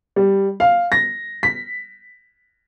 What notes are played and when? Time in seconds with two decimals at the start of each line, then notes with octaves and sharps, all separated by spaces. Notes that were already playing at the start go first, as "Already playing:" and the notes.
0.16 G3
0.60 F5
0.92 A#6
1.43 B6